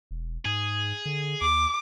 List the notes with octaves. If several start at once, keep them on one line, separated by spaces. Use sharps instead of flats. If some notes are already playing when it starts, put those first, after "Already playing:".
E1
G#2 G#4
D3
D#2 D6